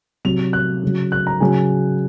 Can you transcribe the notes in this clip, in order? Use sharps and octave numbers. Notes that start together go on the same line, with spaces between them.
C3 F#3 F7
F#6
C#3 F#3
F#6
A#5
C#3 F#3 G#5